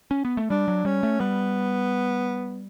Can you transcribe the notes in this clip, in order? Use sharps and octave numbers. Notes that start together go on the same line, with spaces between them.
C#4
B3
A3
G3 D4
F#3
G3 C#4
A3
G3 B3